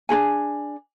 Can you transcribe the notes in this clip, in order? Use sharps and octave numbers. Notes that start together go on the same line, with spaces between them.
D4 F#4 G#4 G#5